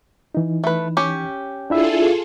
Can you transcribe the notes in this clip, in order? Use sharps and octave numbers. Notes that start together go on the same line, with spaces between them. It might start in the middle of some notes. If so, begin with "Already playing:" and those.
E3 D#4
A3 B4
C#4 G4
D4 E4 F4 G#4 A4 E5